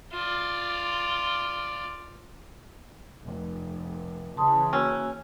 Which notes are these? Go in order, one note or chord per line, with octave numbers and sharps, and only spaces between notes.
F4 D5
F1
C#3 E3 A5 C6 D#6
A#3 C#4 F#4 E6